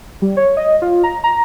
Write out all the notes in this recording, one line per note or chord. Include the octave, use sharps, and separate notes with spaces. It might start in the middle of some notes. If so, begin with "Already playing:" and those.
G3
C#5
D#5
F4
A#5
A#5